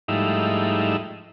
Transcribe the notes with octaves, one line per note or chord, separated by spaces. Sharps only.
G#2 F3 G3 A3 D#4 E4